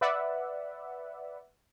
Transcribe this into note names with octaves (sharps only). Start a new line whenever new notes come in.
B4 D5 E5 F#5